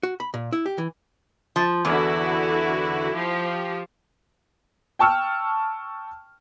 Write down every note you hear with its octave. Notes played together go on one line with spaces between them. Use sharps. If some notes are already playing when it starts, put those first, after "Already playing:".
F#4
B5
A#2
E4
G4
E3
F3
E2 D3 E4 F#4
F3 G4
G5 A5 C#6 E6 F6